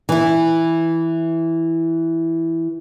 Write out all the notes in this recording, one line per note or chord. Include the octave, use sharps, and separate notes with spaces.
E3 E4